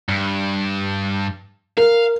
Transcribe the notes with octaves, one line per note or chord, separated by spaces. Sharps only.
G2
A#4 F5